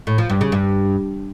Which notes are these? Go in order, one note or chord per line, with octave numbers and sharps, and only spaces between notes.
A2
F3
G2
C#3
G2